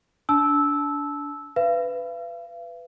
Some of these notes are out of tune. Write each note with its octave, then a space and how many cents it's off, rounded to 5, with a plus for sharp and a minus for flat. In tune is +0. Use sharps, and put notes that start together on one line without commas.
D4 -25 A5 -25 E6 -10
B4 +15 F5 -45